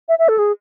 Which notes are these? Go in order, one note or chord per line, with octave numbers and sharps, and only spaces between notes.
E5
E5
A4
G#4